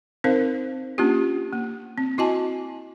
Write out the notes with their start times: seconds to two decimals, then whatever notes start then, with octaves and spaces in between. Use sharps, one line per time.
0.24 C4 D#4 A#4 C5 F5
0.98 A#3 C#4 D4 F4 G4
1.53 A#3
1.98 C4
2.18 E4 F#4 D#5 G#5 A5